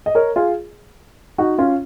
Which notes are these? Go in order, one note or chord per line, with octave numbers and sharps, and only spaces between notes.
D#5
A#4 C#5
F4 G#4
D#4 F#4
C#4 F4